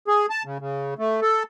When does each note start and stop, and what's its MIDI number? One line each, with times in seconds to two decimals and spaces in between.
0.08 0.26 68
0.30 0.43 81
0.45 0.58 49
0.60 0.94 49
0.98 1.20 57
1.22 1.43 69